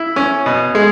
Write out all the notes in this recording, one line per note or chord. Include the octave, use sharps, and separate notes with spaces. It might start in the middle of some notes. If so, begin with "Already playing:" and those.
Already playing: E4
C#4
B2
G#3